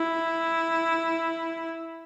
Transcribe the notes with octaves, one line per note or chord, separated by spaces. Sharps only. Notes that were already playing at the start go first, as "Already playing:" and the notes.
Already playing: E4